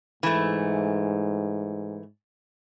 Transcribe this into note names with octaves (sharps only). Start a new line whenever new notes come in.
G#2 E3 A3